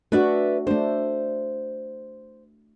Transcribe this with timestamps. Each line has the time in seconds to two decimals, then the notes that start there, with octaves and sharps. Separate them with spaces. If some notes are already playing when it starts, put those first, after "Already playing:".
0.12 A3 D4 F#4 B4 D5 E5
0.67 A3 D4 C5